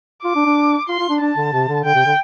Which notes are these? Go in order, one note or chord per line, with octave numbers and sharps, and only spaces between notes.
F4 D6
D4
D4
F4 C6
F4
D4
D4 A5
D3
C3
D3
D3 G5
C3
D3